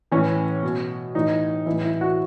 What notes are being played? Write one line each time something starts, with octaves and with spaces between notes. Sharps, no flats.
A2 E3 C#4
B2
A2 E3 D#4
A2 E3 E4
E4
F#4